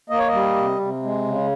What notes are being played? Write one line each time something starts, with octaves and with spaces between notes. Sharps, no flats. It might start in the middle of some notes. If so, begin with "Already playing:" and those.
A#3 D#5
C#5
D#5
G3
C3
C3
G#3
C#3